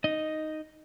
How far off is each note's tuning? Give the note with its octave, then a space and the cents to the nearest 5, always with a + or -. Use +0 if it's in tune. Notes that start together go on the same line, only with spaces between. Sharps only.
D#4 +0 D#5 +0